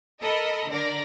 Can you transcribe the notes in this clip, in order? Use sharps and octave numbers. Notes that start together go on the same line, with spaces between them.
A4 A#4 D#5 B5
D3 A#4 D5 A#6